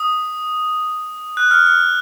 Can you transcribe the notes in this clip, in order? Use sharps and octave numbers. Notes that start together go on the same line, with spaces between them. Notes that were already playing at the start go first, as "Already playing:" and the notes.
Already playing: D#6
F#6
F6
F6